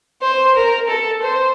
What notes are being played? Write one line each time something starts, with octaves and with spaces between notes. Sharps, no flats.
C5
A#4
A4
C5